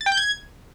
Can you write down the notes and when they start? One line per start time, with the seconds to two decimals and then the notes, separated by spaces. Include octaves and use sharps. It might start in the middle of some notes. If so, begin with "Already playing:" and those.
0.01 A6
0.06 G5
0.12 G6
0.17 G#6